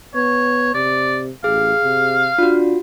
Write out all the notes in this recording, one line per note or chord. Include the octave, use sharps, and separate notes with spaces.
B3 C#5
C3 D5
A1 G#4 F5
C3
D4 F4 F#4